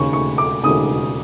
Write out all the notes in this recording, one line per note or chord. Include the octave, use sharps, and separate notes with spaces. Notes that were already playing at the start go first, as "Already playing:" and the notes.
Already playing: E1 D#2 C#3 C#6
C#6
D6
E1 D#2 C#3 D#6